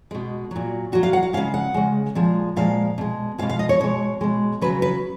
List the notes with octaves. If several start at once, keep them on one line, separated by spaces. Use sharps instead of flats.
B2 G#3
A#2 F#3
A#2 F#3 F#4
F5
F#5
F5
C#3 G#3 F5
F#5
C#3 G#3
A#2 F3 G#3
A#2 F3 G#3 F5
B2 G#3
B2 G#3 F5
F5
D#5
C#5
B2 G#3 C#5
B2 G#3
C#3 F#3 B4
B4